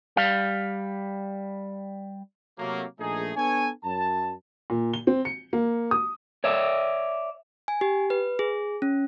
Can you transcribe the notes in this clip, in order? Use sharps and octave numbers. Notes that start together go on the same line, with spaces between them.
G3 F5
C3 F#3 A3 A#3
A#1 A3 D#4 G#4
B3 D4 A4 B4 C#5 G#5
F#2 A5
A#2
G7
C4
C#7
A#3
D#6
C#5 D5 E5
G#5
G4
B4
G#4
C#4